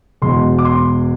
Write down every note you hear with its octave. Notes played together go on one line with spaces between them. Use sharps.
E1 E2 B2 G#3 C6
D6
C6